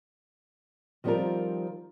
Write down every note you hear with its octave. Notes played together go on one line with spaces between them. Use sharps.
D#3 F3 G3 C4 F4 A#4